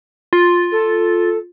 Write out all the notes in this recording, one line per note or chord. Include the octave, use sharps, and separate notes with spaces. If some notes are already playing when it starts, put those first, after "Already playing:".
F4
A4